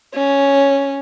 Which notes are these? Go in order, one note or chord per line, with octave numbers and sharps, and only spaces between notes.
C#4